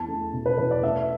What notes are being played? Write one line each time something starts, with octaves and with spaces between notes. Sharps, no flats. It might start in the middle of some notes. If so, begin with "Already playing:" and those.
Already playing: E2 A5
A3
B2
B4
E2 B4
D5
A3 E5